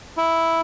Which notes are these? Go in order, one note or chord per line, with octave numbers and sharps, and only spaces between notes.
E4